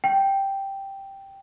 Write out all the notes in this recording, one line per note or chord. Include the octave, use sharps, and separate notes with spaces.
G5